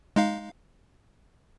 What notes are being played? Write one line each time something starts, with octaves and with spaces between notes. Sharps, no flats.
G#3 D#4 F5